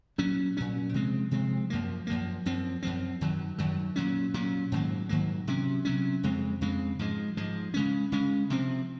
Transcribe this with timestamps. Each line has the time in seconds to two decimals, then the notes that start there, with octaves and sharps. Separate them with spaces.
0.18 A#2 F#3 C#4
0.57 A#2 F#3 C#4
0.94 C3 F3 G#3 C4
1.31 C3 F3 G#3 C4
1.70 F#2 F3 A#3
2.07 F#2 F3 A#3
2.46 F#2 F3 C4
2.83 F#2 F3 C4
3.21 F#2 D#3 F#3
3.58 F#2 D#3 F#3
3.96 A#2 F#3 C#4
4.34 A#2 F#3 C#4
4.72 G#2 D#3 F#3 A#3
5.09 G#2 D#3 F#3 A#3
5.47 C3 F#3 C#4
5.85 C3 F#3 C#4
6.23 F2 C#3 G#3 C4
6.61 F2 C#3 G#3 C4
6.99 G#2 F3 G#3
7.37 G#2 F3 G#3
7.74 C#3 G#3 C#4
8.12 C#3 G#3 C#4
8.50 C3 F3 C4